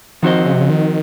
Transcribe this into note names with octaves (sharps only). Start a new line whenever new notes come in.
D#3 F3 C4 F#4 C5 D#5
C#3
C3
C#3
D#3